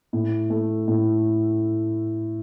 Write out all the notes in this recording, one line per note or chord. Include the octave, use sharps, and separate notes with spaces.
A2
A3
A2